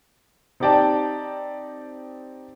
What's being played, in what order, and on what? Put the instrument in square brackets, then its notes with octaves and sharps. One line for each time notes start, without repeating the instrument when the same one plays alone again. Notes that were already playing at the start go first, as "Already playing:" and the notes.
[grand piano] C4 D#4 G4 D5 G5 A5